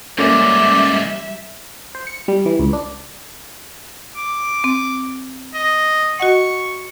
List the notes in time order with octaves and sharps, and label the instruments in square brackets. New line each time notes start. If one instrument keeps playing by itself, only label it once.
[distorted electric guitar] G#2 E3 [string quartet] G3 E5 [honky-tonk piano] A#3 C#4 A4 [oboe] D5
[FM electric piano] C5
C#7
G3
E3
C#2
D4
[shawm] D6
[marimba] C4
[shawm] D#5
[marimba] F#4 D#5 F#5 [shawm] C#6